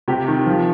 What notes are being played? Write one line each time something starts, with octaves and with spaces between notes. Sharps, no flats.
C3 G4
D#3
F3